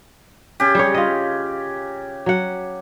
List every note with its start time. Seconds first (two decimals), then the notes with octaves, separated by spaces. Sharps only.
0.60 C#3 G4
0.75 G3 G#4 C#5
0.94 F4 D#5
2.26 F#3 F#5